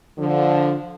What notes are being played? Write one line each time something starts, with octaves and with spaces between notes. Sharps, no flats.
D3 F3